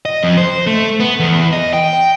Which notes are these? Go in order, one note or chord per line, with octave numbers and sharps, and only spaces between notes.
D#5
F2
C5
A3
B3
E2
D#5
G5